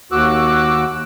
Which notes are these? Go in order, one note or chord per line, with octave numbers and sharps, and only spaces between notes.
D#2 F#4 D6 E6 F#6